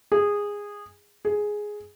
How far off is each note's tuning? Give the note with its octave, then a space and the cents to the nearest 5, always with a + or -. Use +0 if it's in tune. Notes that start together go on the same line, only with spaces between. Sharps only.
G#4 -15
G#4 +5